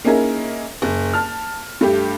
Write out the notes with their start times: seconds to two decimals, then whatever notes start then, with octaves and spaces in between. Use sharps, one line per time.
0.04 A#3 C#4 D#4 E4 G#4 A#4
0.82 F#1
1.14 A5 F6
1.81 G2 A3 G4